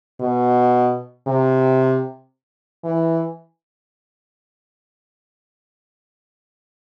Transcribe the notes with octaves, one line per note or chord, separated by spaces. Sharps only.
B2
C3
E3